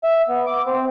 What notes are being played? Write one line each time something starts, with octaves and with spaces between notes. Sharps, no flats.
E5
B3
D6
C4